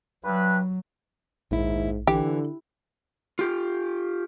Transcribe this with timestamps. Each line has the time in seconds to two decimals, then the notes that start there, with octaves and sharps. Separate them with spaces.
0.25 G2 F#3 B4
1.51 A#1 D#2 G#2 E4
2.07 D3 E3 G4
3.39 F4 G4